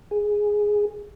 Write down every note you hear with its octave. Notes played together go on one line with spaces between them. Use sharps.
G#4